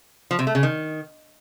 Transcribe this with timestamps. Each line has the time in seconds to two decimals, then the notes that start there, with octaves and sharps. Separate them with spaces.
0.31 F3
0.39 C3
0.47 A3
0.55 C#3
0.63 D#3